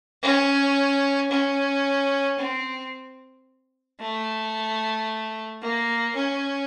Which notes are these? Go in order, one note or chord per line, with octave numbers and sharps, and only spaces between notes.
C#4
C#4
C4
A3
A#3
C#4